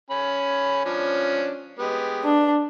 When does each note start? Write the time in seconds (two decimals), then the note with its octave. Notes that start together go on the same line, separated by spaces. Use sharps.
0.10 C#4 G#5 B5
0.85 F3 C#4 D4
1.79 G#3 B3 G4
2.24 D4